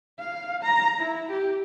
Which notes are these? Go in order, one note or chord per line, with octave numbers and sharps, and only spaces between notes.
F5
A#5
E4
G4